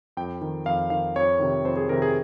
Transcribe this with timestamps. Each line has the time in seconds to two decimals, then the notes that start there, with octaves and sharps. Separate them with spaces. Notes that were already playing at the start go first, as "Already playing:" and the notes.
0.17 F2 G5
0.41 D#3
0.66 F2 F5
0.90 D#3 F5
1.16 F2 C#5
1.40 C3 D#3
1.65 F2 C5
1.77 G#4
1.89 C3 D#3 A#4
2.02 G#4